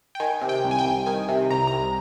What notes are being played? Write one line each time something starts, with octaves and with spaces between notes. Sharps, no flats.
G5
D#3 G#5
C3
G5
C2
G#5
G5
C2
D#3 G#5
C3
C2 A#5
A#5
C2